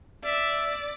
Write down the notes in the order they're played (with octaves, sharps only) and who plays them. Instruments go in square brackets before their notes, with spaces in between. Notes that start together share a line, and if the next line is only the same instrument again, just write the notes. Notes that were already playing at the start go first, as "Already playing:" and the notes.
[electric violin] D5 [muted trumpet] E5